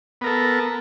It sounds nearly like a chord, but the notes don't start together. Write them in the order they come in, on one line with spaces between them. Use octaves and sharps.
B3 A#4 A4